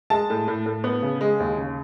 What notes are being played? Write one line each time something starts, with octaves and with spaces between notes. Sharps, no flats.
G#3 A5
A2
A2
A2
B3
C#3
G#3
D#2
C#3